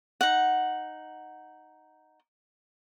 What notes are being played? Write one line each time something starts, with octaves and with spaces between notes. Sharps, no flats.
D#4 F#5